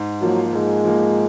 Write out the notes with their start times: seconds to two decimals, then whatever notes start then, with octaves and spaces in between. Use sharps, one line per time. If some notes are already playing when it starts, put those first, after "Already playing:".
Already playing: G#2
0.21 F3 F#3 A#3
0.53 G#2 G#3
0.85 F3 A#3